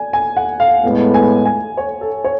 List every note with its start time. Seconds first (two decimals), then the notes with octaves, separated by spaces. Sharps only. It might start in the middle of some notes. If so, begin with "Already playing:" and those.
Already playing: D5 G#5
0.13 G#5
0.37 F#5
0.60 F5
0.83 A2 G#3 B3
1.14 G#5
1.45 G#5
1.77 C#5
2.01 A4
2.24 C#5